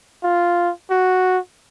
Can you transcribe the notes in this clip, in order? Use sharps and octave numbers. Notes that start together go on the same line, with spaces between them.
F4
F#4